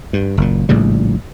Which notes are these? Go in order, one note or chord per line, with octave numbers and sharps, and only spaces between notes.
G2
F#1 A#2
A#1 A2 C#3 G3